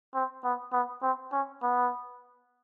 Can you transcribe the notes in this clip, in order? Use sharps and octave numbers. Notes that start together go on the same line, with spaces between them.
C4
B3
B3
C4
C#4
B3